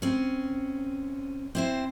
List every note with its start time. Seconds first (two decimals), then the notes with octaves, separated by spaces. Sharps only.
0.02 C4 C#4
1.55 C4 E4 C5